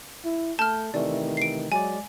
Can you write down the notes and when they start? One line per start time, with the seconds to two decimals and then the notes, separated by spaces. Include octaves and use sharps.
0.25 E4
0.59 A3 A5 F6 G6
0.94 C3 D#3 E3 A3 D5
1.37 C7 D7
1.72 F#3 G#3 D5 G#5